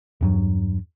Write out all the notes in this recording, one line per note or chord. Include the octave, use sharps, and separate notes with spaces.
E2 G2 F#3